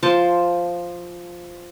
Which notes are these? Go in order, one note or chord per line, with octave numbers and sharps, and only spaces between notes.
F3 C5 A5